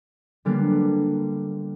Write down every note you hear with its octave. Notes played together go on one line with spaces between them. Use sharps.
D3 G3 A#3 B3